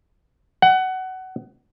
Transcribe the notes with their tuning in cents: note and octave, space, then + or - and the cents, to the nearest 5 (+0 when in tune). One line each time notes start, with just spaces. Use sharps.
F#5 +20